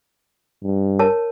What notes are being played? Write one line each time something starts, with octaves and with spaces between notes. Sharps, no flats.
G2
A#4 C#5 A5